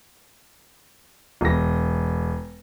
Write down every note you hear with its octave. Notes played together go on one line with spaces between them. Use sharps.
E1 A#6